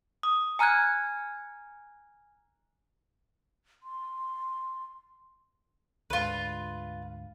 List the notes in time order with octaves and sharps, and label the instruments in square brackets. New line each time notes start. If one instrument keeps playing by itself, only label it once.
[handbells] D#6
G#5 A#5 F6 F#6 G#6
[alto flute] C6
[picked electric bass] D2 G#2 [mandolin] F4 B4